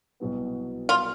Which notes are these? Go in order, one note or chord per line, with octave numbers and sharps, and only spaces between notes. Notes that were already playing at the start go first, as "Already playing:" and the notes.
C2 B2 F#3 B3
F4